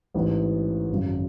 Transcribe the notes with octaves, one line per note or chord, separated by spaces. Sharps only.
A1 G#2 E3
G#1 F#2 C#3